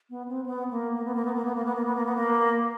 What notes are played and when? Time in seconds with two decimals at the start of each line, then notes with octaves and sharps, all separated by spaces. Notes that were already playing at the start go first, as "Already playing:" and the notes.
0.10 B3
0.28 C4
0.46 B3
0.71 A#3
0.95 A#3
1.05 B3
1.15 A#3
1.25 B3
1.35 A#3
1.45 B3
1.55 A#3
1.65 B3
1.75 A#3
1.85 B3
1.96 A#3
2.06 B3
2.16 A#3